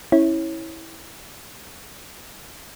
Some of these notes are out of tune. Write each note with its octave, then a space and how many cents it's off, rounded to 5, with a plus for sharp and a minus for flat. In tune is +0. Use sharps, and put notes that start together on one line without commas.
C#4 -25 E4 -15 C#5 -15